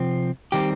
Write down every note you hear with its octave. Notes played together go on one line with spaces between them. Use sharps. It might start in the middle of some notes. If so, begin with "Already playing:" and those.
Already playing: C3 F3 C4
D#3 G3 C4 G4